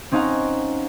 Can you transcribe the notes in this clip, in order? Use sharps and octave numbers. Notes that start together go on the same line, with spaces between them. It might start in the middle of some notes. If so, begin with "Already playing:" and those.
C4 C#4 D#4 F5 F#5 A#5